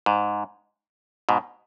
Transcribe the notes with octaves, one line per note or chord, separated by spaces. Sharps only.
G#2
G#2 B2